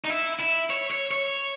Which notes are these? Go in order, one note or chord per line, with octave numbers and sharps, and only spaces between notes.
D#4
E4
E4
C#5
C#5
C#5